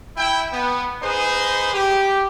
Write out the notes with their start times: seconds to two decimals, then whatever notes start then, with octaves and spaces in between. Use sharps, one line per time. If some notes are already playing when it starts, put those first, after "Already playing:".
0.16 E4 G5
0.52 B3
1.02 D#4 G#4 B4 C5
1.72 G4